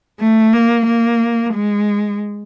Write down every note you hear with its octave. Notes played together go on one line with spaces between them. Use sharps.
A3
A#3
A#3
G#3